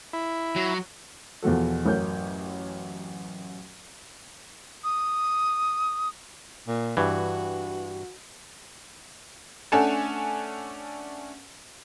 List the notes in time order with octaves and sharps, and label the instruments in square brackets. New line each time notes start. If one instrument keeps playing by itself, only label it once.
[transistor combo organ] E4
[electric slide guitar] F#3
[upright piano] E2 B2 F3 F#4 A4
A1 F#2 A#4 C#5 G6
[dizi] D#6
[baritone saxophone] A#2
[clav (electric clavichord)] G2 E3 [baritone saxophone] F#4
[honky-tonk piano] A3 C#4 D4 A4 F#5 G#5